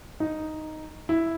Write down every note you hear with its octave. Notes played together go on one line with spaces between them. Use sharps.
D#4
E4